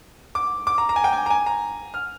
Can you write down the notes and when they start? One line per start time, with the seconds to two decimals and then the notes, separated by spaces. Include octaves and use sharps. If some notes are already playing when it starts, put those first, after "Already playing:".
0.35 D6
0.67 D6
0.78 A#5
0.89 A#5
0.96 G#5
1.04 G5
1.13 G#5
1.26 A#5
1.30 G#5
1.46 A#5
1.94 F6